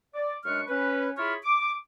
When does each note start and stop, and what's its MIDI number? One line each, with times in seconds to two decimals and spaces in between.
0.15 0.34 74
0.45 0.62 42
0.45 0.62 56
0.45 0.62 62
0.45 0.62 71
0.45 0.62 85
0.45 0.62 89
0.68 1.10 61
0.68 1.10 71
1.18 1.34 64
1.18 1.34 65
1.18 1.34 68
1.18 1.34 73
1.18 1.34 83
1.18 1.34 89
1.43 1.73 86